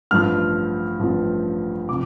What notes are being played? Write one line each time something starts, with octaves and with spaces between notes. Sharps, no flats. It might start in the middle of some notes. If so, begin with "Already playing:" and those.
A1 G2 F3 F6
A1 G2 F3
C3 F3 D6